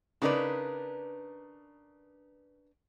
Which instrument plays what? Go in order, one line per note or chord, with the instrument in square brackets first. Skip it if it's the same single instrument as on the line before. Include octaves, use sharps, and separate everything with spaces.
[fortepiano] C#3 D#4 D5 [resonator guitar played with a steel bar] D4 A#4 B4